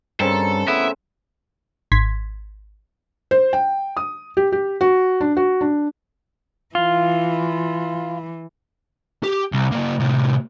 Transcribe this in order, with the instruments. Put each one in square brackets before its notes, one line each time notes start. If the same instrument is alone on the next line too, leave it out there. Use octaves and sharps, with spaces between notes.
[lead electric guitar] G2 [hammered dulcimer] C#3 C4 A#4 [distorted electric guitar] A4
[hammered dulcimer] A3 [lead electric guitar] B3 E4 [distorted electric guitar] E5
[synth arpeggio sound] G#1 C6 G#6 B6
[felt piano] C5
G5
D#6
G4
G4
F#4
D4
F#4
D4
[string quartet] E3 [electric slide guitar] F4
[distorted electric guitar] G4
C2
C#3 A#3
A2 C3